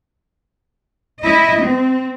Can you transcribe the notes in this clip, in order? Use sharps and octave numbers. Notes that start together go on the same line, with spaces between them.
E4 D#5
C4